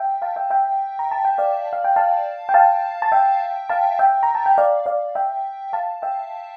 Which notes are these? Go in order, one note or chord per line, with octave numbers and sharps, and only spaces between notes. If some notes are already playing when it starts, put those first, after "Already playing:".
Already playing: E5 G5
F5 A5
E5 G5
E5 G5
A#5
A5
G5
D5 F5
F5
G5
F5 A5
G5
F5 A5
A5
E5 G5
F5 A5
E5 G5
A#5
A5
G5
D5 F5
D5 F5
E5 G5
F5 A5
E5 G5